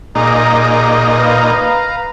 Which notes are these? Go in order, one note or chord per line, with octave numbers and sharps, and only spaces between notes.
A#2 D#4 G#4 A#5 D6
B4 F5 A#5